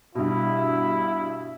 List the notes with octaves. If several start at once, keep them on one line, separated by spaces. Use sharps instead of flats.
G2 B2 E4